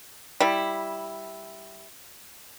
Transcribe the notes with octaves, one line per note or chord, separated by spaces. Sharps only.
G3 E4